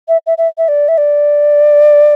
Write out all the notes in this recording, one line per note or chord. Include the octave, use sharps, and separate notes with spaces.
E5
E5
E5
E5
D5
E5
D5